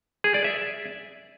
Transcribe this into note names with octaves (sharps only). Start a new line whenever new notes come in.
G#4
D5
E5